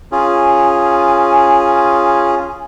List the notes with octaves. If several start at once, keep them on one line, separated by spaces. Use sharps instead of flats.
C#4 F4 G#4 G#5